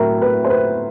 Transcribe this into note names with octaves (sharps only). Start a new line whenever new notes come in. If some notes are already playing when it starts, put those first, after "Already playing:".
Already playing: A2 F#3 A#4 E5
B4
C5
B4